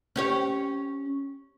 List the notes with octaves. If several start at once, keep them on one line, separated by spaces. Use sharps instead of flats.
C#4 G4 C#5